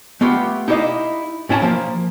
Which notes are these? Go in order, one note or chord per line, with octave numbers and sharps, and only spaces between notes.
A3 B3 F4 G4
D#4 E4 G4 A4 D#5 F5
A2 C#4 E4 G5 A5 A#5
F3 A#3